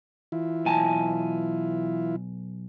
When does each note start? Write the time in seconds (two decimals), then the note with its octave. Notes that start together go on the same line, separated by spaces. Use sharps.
0.32 E3 E4 F4
0.66 B1 G#5 A5